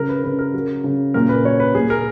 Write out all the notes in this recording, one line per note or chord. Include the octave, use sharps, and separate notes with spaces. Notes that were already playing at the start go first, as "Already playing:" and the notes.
Already playing: C#3 F#3 A#4
B4
C#3 B4
A#4
F#3
C#3
A#2 A#4
B4
F#3 C#5
B4
A#2 G#4
A#4